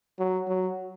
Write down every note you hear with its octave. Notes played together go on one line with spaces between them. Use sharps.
F#3
F#3